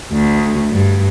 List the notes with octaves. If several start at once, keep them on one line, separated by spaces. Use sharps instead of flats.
D2
G2